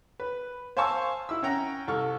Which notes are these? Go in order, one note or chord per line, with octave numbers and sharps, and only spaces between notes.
B4
C5 F5 G#5 A5 C#6 E6
E4 E6
C#4 F#5 G5 A#5
C2 A4 C#6 F6